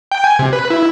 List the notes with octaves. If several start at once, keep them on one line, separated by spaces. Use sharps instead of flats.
G5
G#5
C3
B4
E4